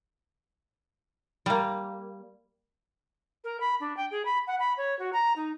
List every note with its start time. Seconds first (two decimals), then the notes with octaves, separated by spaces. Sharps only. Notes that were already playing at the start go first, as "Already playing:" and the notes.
1.46 G3 A#3
3.44 A#4
3.60 B5
3.80 D4
3.97 G5
4.11 G#4
4.25 B5
4.47 F#5
4.59 B5
4.77 C#5
4.99 F#4
5.13 A#5
5.36 D#4